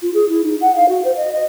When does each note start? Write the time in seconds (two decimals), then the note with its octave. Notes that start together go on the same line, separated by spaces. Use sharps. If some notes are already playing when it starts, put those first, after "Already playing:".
0.02 F4
0.14 G#4
0.29 E4
0.44 D#4
0.61 F#5
0.76 F5
0.89 F#4
1.05 C5
1.16 D#5
1.33 D#5